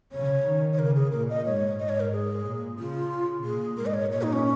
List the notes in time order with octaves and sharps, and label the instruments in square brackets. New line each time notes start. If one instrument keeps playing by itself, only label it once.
[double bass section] C#3 [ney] C#5
[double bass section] D#3
[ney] C#5
[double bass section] C#3 [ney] A#4
[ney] G#4
[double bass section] A#2 [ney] A#4
[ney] D#5
[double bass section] G#2 [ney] C#5
[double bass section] G#2 [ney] D#5
[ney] C#5
A#4
G#4
[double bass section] A#2
[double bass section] C#3 [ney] F4
[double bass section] A#2 [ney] G#4
[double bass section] G#2 [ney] A#4
[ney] D#5
C#5
[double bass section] A#2 [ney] C#5
[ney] D#4
C#4